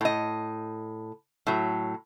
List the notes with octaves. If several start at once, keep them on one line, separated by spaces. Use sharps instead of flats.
A2 D#5
A2 F#3